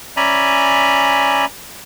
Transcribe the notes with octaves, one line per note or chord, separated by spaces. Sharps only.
C#4 D5 E5 G#5 A#5 B5